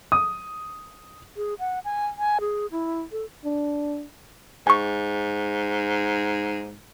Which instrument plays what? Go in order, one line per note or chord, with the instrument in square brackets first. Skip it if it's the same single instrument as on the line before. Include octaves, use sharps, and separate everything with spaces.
[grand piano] D#6
[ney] G#4
F#5
G#5
G#5
G#4
E4
A4
[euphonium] D4
[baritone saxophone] G#2 [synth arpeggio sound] G#5 C#6